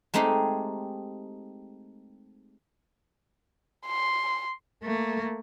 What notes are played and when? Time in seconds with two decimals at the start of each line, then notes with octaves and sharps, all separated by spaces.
0.14 G#3 A3 C4 D#4 G4 G#4
3.86 C6
4.83 A3 A#3